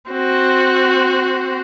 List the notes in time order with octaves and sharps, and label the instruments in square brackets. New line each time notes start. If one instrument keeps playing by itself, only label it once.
[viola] C4 F#4